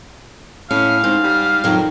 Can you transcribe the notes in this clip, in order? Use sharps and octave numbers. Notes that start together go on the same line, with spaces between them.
A2 C#4 F5
G#2 C4
G3
F2 D#3 F#3